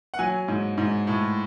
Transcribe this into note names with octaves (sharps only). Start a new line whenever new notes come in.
F#5
F#3 G#5
G#2
G#2
A2